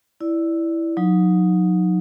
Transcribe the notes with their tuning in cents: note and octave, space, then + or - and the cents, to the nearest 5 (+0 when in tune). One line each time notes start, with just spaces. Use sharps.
E4 +0 D5 +0
F#3 -35 D#4 +0